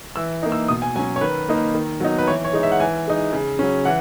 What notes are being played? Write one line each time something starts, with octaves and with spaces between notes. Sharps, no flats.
E3 E6
A#3 D#4
E6
B2 D#6
G#5
F#3 C#4 G#5
C#5
D#3 B4
A#3 D#4
D#3
F#3 B3 D#4
B4
E3 C#5
C#5
G#3 D#4
E5
F#5
E3 G#5
G#3 D#4
C#3
F#3 C#4
E3 F#5